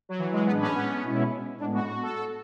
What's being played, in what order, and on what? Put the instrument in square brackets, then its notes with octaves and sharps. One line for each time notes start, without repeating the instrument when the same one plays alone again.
[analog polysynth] F#3
E3
G#3
[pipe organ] A2 G#3 D4 G#4 B4 [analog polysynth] B3
[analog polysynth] C#4
B3
[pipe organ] B2 G#3 C#4 E4
[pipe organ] A2 G#3 B3 [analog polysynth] D4
[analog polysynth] F#4
F#4
A4
A4